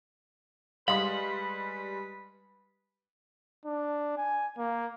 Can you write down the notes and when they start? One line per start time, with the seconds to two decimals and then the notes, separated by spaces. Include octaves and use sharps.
0.88 G3 G#3 B4 F5 B5 C6 D#6
3.65 D4
4.17 G#5
4.58 A#3